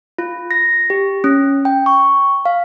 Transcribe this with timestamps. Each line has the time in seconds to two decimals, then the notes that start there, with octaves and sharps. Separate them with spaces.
0.18 F4
0.51 A#6
0.90 G4
1.24 C#4
1.65 G5
1.86 C#6
2.45 F5